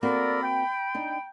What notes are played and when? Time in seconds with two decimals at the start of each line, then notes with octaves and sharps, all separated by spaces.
0.03 A#3 C4 F#4 A4 A#4 D5 B5
0.43 G5
0.95 D4 D#4